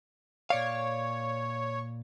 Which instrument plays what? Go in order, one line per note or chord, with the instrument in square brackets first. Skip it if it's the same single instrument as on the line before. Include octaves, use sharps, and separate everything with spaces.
[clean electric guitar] A#2 D5 F5 [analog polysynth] C#5